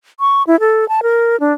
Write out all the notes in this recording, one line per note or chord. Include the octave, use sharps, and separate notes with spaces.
C#6
E4
A4
A5
A#4
D4